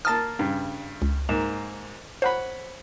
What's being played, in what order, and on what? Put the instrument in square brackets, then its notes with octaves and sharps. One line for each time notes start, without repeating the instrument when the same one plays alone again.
[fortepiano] A#3 A5 D#6 [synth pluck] F6 A6
[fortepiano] G2 C#3
[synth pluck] C#2
[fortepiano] G#2 A#3 [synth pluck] E7
[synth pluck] C5 [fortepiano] C#5 F#5 B5